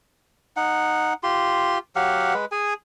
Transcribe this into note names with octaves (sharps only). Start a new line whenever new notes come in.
D#4 F#5
F4 G4 C6
F#3 G4 F5 F#5
G#3 B4
G#4 G#5